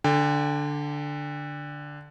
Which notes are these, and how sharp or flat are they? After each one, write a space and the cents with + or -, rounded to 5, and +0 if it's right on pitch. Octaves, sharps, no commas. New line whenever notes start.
D3 +0 D5 +0 G5 +35